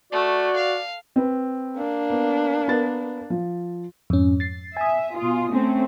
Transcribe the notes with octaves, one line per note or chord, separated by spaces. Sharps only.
A3 F#4 D5
F5
C4 B4
A#3 D4
B3
B3 A#4 A6
F3
F2 G#2 C#4
A6 C7
E5 G#5 D#6
B2 F4
A3 C4 C#4